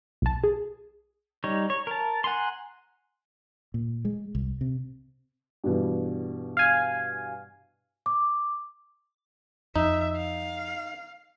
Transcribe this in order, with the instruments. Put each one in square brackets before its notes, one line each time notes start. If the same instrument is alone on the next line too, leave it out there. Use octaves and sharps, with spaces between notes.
[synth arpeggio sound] B1 A5
G#4
[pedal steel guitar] G3 D#4 C#5
C#5
A#4 A5
F#5 G#5 A#5 C6
[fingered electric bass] A#2
G#3
C2
C3
[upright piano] G2 B2 E3
[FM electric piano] F5 G#5
[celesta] D6
[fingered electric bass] F2 [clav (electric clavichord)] D#4 [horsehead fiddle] E5
[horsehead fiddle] F5